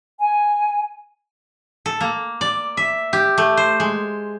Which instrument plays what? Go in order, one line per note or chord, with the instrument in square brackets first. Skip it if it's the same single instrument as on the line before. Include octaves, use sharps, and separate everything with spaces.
[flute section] G#5
[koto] A4
A#3
D5
E5
G4
A3
C5
G#3